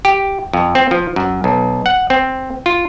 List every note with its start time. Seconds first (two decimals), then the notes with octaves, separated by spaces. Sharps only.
0.05 G4
0.53 F2
0.75 C4
0.91 F3
1.16 F#2
1.44 B1
1.86 F#5
2.10 C4
2.66 F4